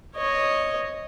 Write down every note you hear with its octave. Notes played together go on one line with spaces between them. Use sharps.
C#5 D#5